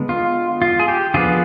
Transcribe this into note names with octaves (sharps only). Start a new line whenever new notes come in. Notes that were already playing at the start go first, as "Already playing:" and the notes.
Already playing: D3 G#3 B3
F4
F4
G#4
G4
D3 F3 B3 F4 G#4